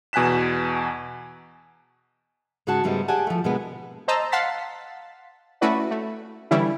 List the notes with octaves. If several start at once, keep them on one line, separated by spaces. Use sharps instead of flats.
E2 B2 G#5 F#6 B6 E7
G#2 C#3 G#3 F#4 F#5 A5
G#2 C#3 G3 A3 B3 D#4
G4 G#4 D5 F#5 G#5 A5
F3 A3
B2 D3 G#3 A#3 B3
C5 D#5 A5 A#5 E6
F5 F#5 A5 C6 A6 B6
A3 C#4 E4 F#4 B4 D5
A3
D3 E3 G3 C#4 E4